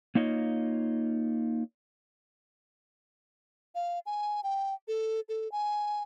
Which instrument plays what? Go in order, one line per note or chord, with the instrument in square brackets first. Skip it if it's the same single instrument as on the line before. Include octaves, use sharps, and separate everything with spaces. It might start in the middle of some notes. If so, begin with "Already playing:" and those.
[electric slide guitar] A#3 D#4 F4 C#5 D#5
[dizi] F5
G#5
G5
A4
A4
G#5